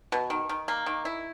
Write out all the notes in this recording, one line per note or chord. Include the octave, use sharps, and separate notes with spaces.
B2
D#3
D#3
A#3
D#3
E4